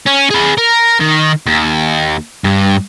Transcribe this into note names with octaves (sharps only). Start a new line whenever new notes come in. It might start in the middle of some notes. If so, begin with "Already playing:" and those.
C#4
G#4 B4
A#4
D#3
D#2
G2